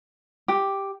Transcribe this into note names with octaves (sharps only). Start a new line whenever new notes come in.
G4